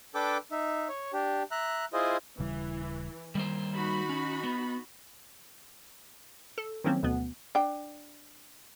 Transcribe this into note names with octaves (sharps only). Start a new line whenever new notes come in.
D4 A4 B4 G5 D6
D#4 E5
C#5
D4 G4
E5 A#5 F#6
E4 F4 G#4 C5 D#5
D#1 C#3 E3 G3
D#3 G3 A#3 C5
D#4 F#4 B5
C#4
B3
A4
D#3 F3 F#3 A#3 C4 C#4
D2 B2 B3
D4 G5